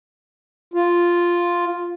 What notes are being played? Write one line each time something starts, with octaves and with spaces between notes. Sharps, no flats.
F4